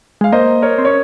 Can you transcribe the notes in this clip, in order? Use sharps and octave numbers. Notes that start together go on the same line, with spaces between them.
G#3 F5
A#3 C5 D#5
A#4 C#5
C4
C#4 C#5